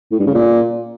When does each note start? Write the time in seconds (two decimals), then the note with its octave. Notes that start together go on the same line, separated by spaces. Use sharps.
0.12 A2
0.19 G2
0.27 C#3
0.34 A#2